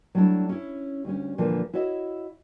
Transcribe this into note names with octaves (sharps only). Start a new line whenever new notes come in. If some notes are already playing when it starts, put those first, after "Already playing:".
F#3 G3 A3 D4 E4
C#4 E4
D2 G3 C#4
A#2 D3 E3 F3 G3
E4 F#4 C#5 D#5 E5